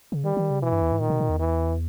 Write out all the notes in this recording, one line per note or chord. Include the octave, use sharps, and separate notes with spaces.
C#3
D#3 G3
D#3
C#3
B2 E3
G2
E2
G#2
A#2 D#3
B2
A#2
E2
E3